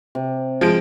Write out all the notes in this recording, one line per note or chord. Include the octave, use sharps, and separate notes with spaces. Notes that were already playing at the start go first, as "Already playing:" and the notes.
C3
F3 G#3 D7